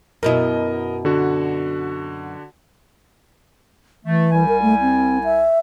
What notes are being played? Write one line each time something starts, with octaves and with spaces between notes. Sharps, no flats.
F#2 B2 E4 A#4 D#5
D3 F#4
E3 A3
C2 G3 G#5
A#4
A3
C4
E5